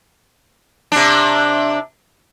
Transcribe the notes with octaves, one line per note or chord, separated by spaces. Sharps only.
C3 D4